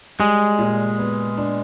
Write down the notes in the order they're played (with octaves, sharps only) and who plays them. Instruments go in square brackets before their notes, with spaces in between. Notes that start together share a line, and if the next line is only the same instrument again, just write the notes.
[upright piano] G3 [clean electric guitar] G#3
[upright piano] A#2
B3
D4